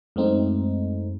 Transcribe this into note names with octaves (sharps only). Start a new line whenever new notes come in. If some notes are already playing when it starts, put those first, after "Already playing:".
F#2 G#3 A3 C4 D#4